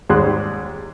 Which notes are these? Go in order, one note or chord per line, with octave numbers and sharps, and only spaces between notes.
D#2 G#2 G3 G#4 C6 F#6